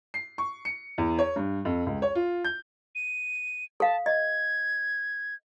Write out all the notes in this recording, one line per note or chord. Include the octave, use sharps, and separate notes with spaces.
C7
C#6
C#7
E2
C#5
G2
F2
C#2
C#5
F4
G6
D#7
A4 F5 A5
D#5 G#6